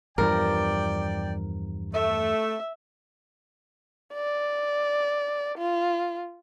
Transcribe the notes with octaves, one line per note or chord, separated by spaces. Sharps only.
E2 G2 F3 A#4 D5 G5
A3 E5
D5
F4